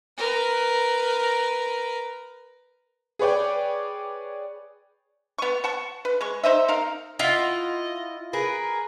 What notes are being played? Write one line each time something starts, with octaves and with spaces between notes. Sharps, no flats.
A#4 B4
G#4 B4 C#5 D5 G5
B3 C#6
F#5 A5 C#6
B4
G#3 C#6
D#4 C5 D#5 E5
D#4 A#4 F5
E4 F4 D#5 F#5
G#4 A#4 B4